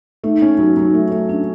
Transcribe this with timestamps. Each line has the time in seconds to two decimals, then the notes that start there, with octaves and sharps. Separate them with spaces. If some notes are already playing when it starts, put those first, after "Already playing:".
0.24 A3 D#4
0.42 C#4
0.59 F#3
0.77 F#3
0.94 A3
1.11 A3
1.29 C#4 D4